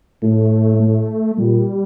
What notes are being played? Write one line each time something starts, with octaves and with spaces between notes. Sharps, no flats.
A2 A3
A3
A#2 G3